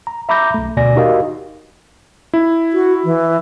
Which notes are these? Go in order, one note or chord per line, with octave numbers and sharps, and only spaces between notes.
A#5
E5 A#5 B5 D6 G6 A#6
B1 A3
D2 B2 D5 G#5 A#6
D#4 F#4 G4 A#4 D#5 F5
E4
F#4
E3